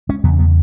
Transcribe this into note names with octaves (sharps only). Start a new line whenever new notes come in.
G#3 C#4
E2 C#3 F#3 B3
F#3 B3